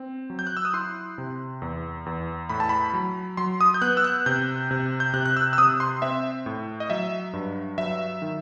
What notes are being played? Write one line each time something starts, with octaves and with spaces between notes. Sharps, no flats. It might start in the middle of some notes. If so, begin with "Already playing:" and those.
Already playing: C4
F#3
G6
F#6
E6
D#6
E4 C6
C3
E2
E2
A2 B5
A5
B5
F#3
F#3 C6
D#6
G6
B3 F#6
E6
F#6
C3 G6
C3
G6
C3 F#6
F#6
E6
E6
C3 D#6
C6
C4 E5
A2
D#5
F#3 E5
G2
F#3 E5
D#3